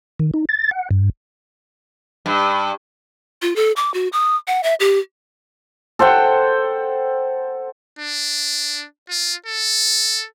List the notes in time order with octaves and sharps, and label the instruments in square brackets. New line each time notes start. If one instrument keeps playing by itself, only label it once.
[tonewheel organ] D#3
D#4
A6
F#5
G2
[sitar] G2
[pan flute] F4
A4
D6
F#4
D#6
F#5
E5
G4
[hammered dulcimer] A4 C5 F#5 G5
[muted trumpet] D4
F4
A4